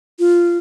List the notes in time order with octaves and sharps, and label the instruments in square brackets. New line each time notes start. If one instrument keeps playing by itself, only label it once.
[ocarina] F4